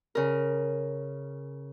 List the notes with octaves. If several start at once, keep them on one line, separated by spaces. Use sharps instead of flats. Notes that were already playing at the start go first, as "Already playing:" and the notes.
C#3 A#4